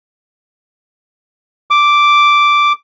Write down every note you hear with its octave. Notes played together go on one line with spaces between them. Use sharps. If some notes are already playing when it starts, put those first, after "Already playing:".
D6